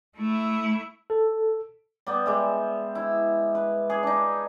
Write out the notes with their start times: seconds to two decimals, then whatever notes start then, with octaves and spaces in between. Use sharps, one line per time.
0.17 A3 E4
1.10 A4
2.07 G3 B3
2.26 G3 G#3 E5
2.95 E4
3.55 B4
3.90 G#4
4.03 D4 D#4